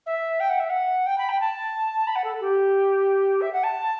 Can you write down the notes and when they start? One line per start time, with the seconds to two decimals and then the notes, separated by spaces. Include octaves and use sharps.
0.06 E5
0.40 G5
0.49 F#5
0.59 E5
0.69 F#5
1.06 G5
1.18 B5
1.28 G5
1.40 A5
2.07 B5
2.15 F#5
2.24 A4
2.40 G4
3.41 E5
3.52 F#5
3.63 A5